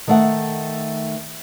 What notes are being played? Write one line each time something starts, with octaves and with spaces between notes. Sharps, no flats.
D#3 A3 F#5